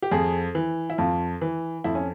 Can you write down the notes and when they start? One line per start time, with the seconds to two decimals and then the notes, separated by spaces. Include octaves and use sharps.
0.02 G4
0.11 F2 G#4
0.55 E3
0.90 E4
0.98 F2 F4
1.41 E3
1.84 F2 E4
1.95 C#4